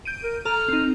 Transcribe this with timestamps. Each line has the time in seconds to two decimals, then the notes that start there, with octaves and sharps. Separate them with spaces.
0.05 G6 D7 D#7
0.23 A#4
0.45 A4 A#5 F6
0.68 C4 D#4